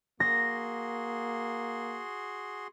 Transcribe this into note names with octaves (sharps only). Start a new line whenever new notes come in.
A#3 F#4 G#4 C6 A#6